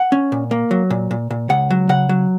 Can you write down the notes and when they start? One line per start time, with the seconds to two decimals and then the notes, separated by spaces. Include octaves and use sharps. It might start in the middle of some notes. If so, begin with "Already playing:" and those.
Already playing: F#5
0.12 C#4
0.32 A#2
0.51 A#3
0.71 F#3
0.90 A#2
1.11 A#2
1.31 A#2
1.50 C#2 F#5
1.71 F#3
1.89 C#3 F#5
2.09 F#3